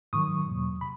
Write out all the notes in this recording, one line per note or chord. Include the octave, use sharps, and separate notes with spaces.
G#2 D#3 F#3 C#6 D#6
E2 B2 F#3 A#3
C3 B5